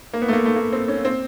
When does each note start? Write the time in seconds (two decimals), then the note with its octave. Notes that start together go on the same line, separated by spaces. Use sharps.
0.13 A#3
0.22 B3
0.28 A3
0.33 A#3
0.45 A3
0.56 A#3
0.72 C4
0.88 C#4
1.05 C4